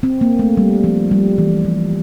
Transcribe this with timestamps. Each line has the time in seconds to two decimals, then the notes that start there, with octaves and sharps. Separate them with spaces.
0.03 C4
0.21 A#3
0.39 A3
0.57 G3
0.84 F3
1.11 G3
1.38 E3
1.65 F3